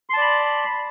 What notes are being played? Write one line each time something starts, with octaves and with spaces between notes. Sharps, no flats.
D5 A5 B5 C6